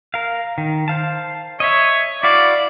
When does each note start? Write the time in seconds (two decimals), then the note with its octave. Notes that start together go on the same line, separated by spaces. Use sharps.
0.14 A#4 F5
0.58 D#3
0.88 C5 F5 A5
1.60 C#5 D#5 E5
2.23 E4 F#4 D5 F5